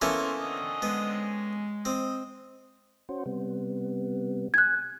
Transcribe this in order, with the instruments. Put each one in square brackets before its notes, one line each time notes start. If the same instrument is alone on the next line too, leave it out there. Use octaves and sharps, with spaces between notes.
[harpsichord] A#3 B3 E4 [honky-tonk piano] C#4 A4 [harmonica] C#5 C6
[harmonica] D3 C4 D#5
[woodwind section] G#3 [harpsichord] B3
[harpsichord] C4 [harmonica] D#5
[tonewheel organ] C#4 F#4 C5
C3 G3 B3
[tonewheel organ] G#5 [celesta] F#6 G#6